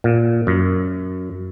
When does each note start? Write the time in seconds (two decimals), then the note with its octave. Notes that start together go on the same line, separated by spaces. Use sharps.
0.04 A#2
0.47 F#2